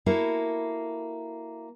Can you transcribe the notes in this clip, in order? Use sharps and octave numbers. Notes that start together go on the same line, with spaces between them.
A#3 E4 F#4 A4